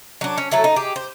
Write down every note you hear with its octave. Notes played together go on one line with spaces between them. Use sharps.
F#3 D4
C#4
F#3 A3 E4 A4
D#4
G4 G#4
C5